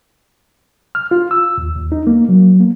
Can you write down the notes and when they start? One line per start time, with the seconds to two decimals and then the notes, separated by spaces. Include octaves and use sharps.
0.95 F6
1.11 F4
1.31 E6
1.58 D#2
1.76 D#2
1.92 D#4
2.07 A#3
2.29 F#3
2.60 A#3